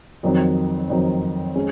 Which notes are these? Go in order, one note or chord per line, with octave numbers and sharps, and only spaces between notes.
F2 D#3 F#3 C4 D#4
F2 D#3 F#3 C4 D#4
G#3 C#4